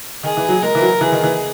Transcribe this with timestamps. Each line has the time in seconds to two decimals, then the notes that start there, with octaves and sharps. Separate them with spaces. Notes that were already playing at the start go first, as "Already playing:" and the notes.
0.23 D#3 G#4
0.37 E3
0.49 F#3
0.62 G#3 A#4
0.75 E3
0.82 F#3
1.01 E3 G#4
1.12 D#3
1.24 E3